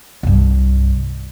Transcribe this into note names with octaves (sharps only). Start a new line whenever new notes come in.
C2 G2